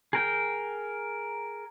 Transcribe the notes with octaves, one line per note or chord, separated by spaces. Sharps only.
G#4 A#4 G5